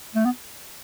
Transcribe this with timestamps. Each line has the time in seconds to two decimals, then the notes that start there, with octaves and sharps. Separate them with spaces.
0.15 A3
0.25 B3